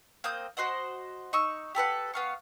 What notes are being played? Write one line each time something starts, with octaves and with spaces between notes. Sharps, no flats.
A#3 C4 D#6 G6
F#4 C5 D#5 F#5
D#4 C#6 E6
G4 A4 B4 F#5
B3 F5 C#6